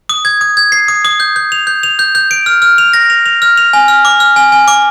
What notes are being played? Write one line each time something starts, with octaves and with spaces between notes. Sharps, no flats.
D#6
G#6
D#6
G#6
C7
D#6
D#6
G6
G6
F7
G6
F7
G6
G6
D7
F6
F6
F7
A#6
F7
F7
F6
F7
G#5
F6
D6
F6
G#5
G#5
D6